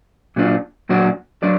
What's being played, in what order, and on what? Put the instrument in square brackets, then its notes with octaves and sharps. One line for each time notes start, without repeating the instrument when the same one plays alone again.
[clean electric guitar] A#2 F#3 D4 F4
A#2 F#3 D4 F#4 D5
F#3 D4 D5